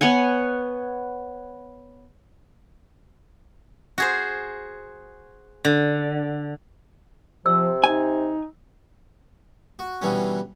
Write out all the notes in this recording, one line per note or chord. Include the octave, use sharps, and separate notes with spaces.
B3 C#5 F#5 G#5
F#4 G#4 C5
D3
C3 F3 E6
D#4 G#5
F#4
B2 D3 E3 G3 C#4